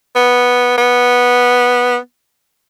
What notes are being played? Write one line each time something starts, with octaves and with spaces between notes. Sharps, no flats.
B3
B3